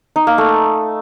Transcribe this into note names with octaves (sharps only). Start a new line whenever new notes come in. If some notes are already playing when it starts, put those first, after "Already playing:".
D#4
A#3
A3